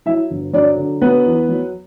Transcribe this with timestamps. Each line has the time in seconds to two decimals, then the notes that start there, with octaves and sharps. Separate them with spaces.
0.06 F#3 E4 E5
0.30 G1
0.53 F#3 D4 D5
0.77 D3
1.01 F#3 B3 B4
1.26 E2
1.49 F#3